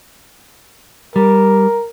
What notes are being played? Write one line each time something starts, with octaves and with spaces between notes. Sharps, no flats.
G3 A#4